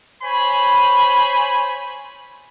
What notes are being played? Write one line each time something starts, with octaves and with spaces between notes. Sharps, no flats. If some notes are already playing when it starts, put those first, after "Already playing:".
C5 C#5 G#5 B5